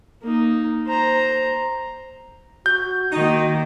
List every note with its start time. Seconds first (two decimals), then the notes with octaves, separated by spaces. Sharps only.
0.23 A#3 D#4
0.86 C5 A#5
2.66 F#4 G6
3.12 D#3 A#3 D#4